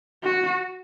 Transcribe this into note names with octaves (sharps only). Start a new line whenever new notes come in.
F#4